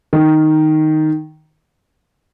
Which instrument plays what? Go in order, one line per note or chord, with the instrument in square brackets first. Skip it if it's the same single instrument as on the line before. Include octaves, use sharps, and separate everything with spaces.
[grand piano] D#3